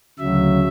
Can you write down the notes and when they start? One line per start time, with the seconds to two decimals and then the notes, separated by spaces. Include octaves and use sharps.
0.19 D2 C#3 F#3 E5